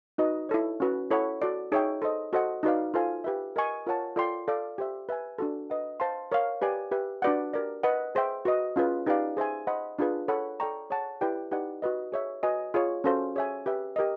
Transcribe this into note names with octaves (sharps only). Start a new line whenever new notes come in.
D#4 F#4 B4 D#5
E4 A4 C#5
C#4 F#4 B4
E4 A4 C#5 F#5 B5
F#4 A4 D5
D#4 G#4 C#5 E5 G5
A4 C5 D#5
F#4 A4 C5 D#5 F#5
D#4 F#4 B4 D5 F5
F4 A4 C5 F5 G#5
G4 B4 E5
A#4 D#5 G#5 C#6
F4 A#4 C#5 F#5 A5
F4 A4 D5 G5 C6
A4 D5 F5
G4 C5 E5
B4 E5 G#5
D4 F#4 A4
B4 D#5 F#5
C5 F5 A5 C6
A#4 C#5 F5
G4 B4 D5 F5 G#5
G4 B4 E5
D4 F#4 B4 D5 F#5
G4 A#4 D5
B4 D#5 F#5
G#4 C5 E5 G5
F#4 B4 D#5
C#4 F4 G#4 B4
D#4 G4 B4 D5 F5
G#4 C5 E5 G#5
C5 D#5 F#5 B5
D4 F4 G#4 B4
A4 C#5 F#5 B5
A4 D5 G5 A#5 C#6
G#4 C#5 F#5 A5
E4 G4 B4 D5 G5
D#4 G4 B4 D5 F#5
F#4 B4 D#5
G#4 C#5 E5
F#4 B4 D#5 G#5
F4 G#4 C#5
C#4 F#4 A4 C5 F5
G#4 C#5 E5 G#5
G4 B4 E5
G4 A#4 D#5